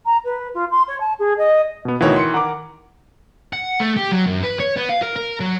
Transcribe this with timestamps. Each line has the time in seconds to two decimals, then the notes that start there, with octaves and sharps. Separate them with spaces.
0.06 A#5
0.25 B4
0.55 F4
0.71 C6
0.88 C#5
1.00 A5
1.19 G#4
1.38 D#5
1.85 B2 B3
2.01 D2 B2 D#3 E3 C#5
2.16 C6 C#7
2.34 A#4 F#5 D6
3.53 F#5
3.80 A3
3.97 G4
4.12 F#3
4.26 F#2
4.44 B4
4.60 C#5
4.76 B3
4.89 F5
5.02 A#4
5.16 A#4
5.40 F#3